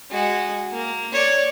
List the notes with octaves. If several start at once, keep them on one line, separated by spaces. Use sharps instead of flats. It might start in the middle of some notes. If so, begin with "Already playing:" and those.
G#3 F#4
A#3
C#5 D5